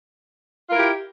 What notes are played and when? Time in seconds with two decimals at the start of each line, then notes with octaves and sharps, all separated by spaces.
0.70 F4
0.72 A#4
0.75 E4
0.78 G4